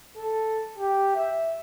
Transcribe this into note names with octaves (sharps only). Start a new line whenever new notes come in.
A4
G4
E5